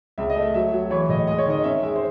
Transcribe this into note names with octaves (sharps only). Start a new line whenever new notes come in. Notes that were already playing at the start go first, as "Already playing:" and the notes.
C#2 E5
D#5
A3
E5
F#3 E5
F#3
E3 C#5
A2 D#5
G#3 D#5
C#5
D#3 D#5
C#4 E5
G#3 E5
C5